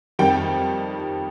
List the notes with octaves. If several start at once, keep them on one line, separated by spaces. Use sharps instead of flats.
F2 D#3 G3 G5